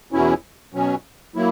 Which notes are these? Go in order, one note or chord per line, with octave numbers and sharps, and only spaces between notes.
E2 B2 F#3 C#4 E4
B2 F#3 C#4
F#3 A#3 E4